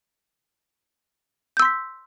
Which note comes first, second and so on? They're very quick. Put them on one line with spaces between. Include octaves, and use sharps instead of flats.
G6 E6 C6 B6